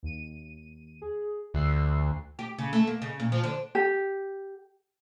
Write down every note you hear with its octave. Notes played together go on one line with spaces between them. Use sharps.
D#2 D#7
G#4
D2 E6 F#6 C7
G4
C#3
A3
A#3
C#3
A#2
F3
D3
G4